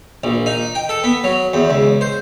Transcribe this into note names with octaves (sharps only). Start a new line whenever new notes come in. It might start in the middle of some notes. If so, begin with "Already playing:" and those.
A#1
D#4
G5
A4
B3
F#3
E2
C#2
C5